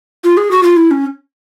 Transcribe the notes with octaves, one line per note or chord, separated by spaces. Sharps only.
F4
G#4
F#4
F4
E4
C#4